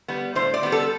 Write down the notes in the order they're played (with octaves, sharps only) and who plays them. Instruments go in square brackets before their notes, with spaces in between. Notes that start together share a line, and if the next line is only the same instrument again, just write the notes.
[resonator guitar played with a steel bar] G3 B3
A2 C5
D5
G3 B3
A4